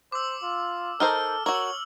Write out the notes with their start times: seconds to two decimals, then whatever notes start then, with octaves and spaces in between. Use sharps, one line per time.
0.12 C5 D6 E6
0.42 F4
1.00 D#4 A4 A#4 C5 F6
1.46 F#4 A#4 C#5 E6 F#7